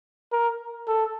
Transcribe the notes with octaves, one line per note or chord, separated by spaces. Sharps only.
A#4
A4